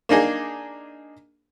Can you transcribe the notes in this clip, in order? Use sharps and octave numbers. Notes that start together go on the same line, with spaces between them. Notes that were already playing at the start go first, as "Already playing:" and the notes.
A#3 D4 D#4 G#4